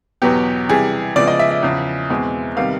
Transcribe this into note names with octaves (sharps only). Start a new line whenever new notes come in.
E2 B2 F#3 B3 G4
C3 E3 G3 G#4
C#3 F3 G#3 B3 E4 D5
D#5
E5
E5
E2 C#3 F3
E2 B2 G#3 C4
C3 D#3 G3 B3 F5